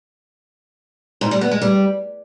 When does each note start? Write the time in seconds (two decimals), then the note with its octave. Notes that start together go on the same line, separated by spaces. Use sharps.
1.21 G#2
1.31 G3
1.41 B3
1.51 G#3
1.62 G3